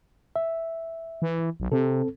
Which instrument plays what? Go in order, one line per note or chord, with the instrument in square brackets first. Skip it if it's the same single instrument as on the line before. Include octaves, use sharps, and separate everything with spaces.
[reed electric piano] E5
[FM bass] E3
B1
[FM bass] C3 [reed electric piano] C4 A4